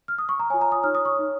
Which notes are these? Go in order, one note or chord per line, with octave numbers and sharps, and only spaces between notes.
F6
D#6
C#6
A#5
F4 C#5 G#5
A#5
D#6
D#4 C#5 F6
D#6
C#6
D#4 C#5